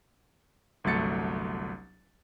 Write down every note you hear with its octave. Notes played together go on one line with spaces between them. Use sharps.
G1 C2 F#3 A3 A6 C#7